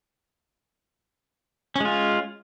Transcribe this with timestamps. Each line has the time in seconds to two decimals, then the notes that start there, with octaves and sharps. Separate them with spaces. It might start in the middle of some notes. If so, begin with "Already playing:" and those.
1.76 C#4
1.80 G#3
1.85 F4